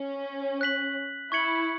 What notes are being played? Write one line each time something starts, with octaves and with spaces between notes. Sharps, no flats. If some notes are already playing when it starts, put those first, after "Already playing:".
Already playing: C#4
F#6 B6 F#7
E4 C#6 G#6 C#7 F#7